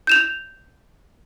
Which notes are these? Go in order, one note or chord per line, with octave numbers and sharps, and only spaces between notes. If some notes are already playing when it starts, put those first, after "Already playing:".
G6 E7 F7